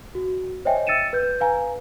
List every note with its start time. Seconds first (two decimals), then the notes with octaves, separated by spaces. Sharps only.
0.15 F#4
0.65 C5 C#5 D#5 E5 G5 G#5
0.87 E6 A6 C#7 D#7 E7
1.13 B4 G6
1.40 B4 F5 G#5 A#5